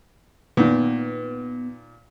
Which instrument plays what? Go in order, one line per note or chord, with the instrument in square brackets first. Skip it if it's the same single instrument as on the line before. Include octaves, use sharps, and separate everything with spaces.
[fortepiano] A#2 D#3 [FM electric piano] B3